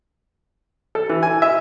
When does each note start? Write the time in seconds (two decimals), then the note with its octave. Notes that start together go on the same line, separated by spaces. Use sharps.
0.95 A4
1.09 E3
1.23 G#5
1.42 E5